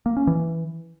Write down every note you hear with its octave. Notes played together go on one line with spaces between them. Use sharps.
A#3
C#4
E3